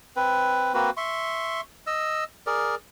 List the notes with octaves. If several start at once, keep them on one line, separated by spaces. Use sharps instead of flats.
C4 B4
A#3 C4 F#4 B4
E5 C6 C#6
D#5 E6
G#4 A#4 D5